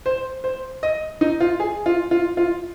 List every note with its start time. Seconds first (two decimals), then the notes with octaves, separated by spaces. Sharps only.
0.06 C5
0.44 C5
0.83 D#5
1.21 D#4
1.41 F4
1.60 G#4
1.86 F4
2.11 F4
2.37 F4